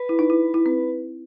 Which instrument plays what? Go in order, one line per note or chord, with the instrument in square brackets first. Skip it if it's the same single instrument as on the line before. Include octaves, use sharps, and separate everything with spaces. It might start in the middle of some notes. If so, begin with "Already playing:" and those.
Already playing: [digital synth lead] B4
[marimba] E4
D#4
E4
E4
C4